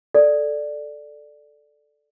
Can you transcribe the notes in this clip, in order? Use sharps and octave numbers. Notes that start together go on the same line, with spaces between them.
A4 D5